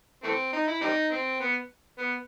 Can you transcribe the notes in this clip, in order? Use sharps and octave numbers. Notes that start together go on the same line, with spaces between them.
E3 A3 C4
D#4
E4
G3 C4 D#4
C4
B3
B3